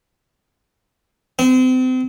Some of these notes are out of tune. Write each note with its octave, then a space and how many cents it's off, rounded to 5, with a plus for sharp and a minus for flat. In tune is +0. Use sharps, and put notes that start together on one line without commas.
C4 -35